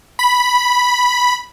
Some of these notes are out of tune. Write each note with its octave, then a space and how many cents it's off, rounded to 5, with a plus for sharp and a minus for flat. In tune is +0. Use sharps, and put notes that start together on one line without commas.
B5 -5